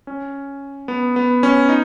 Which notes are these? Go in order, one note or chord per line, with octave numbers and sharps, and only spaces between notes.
C#4
B3
B3
C#4
D#4